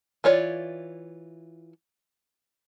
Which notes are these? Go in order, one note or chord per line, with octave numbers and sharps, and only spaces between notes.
E3 F4 C#5 D5